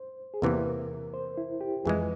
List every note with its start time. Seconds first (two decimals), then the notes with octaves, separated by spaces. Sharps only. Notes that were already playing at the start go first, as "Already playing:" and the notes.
Already playing: C5
0.34 G#4
0.42 E2 C3 E3 A#3 A#4
1.14 C5
1.37 E4
1.61 G4
1.85 F2 E3 G#3 G#4